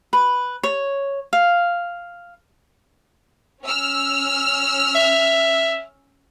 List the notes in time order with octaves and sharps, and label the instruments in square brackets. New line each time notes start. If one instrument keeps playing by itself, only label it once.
[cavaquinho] B4
C#5
F5
[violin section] C#4 E6 F6
[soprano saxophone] E5